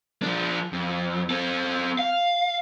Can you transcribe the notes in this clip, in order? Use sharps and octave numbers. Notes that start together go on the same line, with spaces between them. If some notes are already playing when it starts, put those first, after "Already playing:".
F3 D4
F2
C4 A4
F5